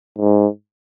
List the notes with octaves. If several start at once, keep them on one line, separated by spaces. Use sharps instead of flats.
G#2